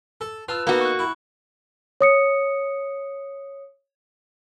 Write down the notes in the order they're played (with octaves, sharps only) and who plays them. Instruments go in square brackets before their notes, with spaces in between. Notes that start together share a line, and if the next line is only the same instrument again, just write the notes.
[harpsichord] A4
[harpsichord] F4 [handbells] B4 A5 E6
[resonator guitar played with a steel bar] A#3 F#4 [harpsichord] B3 D#4
[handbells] C#6 F#6
[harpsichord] E4
[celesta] C#5 D#6 C#7